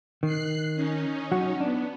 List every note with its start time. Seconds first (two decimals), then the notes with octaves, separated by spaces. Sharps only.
0.23 D#3 F#6 C7
0.75 C#4 D#4
1.32 F#3 F#4
1.61 B3 D4